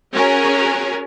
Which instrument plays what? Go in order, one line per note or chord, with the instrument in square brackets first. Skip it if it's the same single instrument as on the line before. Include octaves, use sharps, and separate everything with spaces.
[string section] C#4 F#4 G#4 A#4